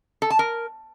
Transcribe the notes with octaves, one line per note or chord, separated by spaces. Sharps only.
A4
A5
A#4